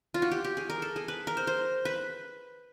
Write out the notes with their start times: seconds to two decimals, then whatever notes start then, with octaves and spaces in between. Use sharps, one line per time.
0.14 F4
0.22 F#4
0.31 G4
0.44 G4
0.57 G#4
0.70 A#4
0.82 A4
0.96 G#4
1.08 B4
1.27 A#4
1.37 C5
1.47 C5
1.85 B4